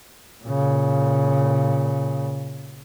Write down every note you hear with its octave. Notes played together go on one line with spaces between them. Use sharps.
A#2 C#3